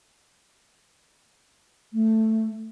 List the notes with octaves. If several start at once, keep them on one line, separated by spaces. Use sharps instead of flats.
A3